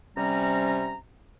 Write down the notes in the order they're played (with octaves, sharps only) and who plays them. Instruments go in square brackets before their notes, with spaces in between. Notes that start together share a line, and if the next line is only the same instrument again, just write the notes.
[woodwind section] C3 G3 C#4 A#5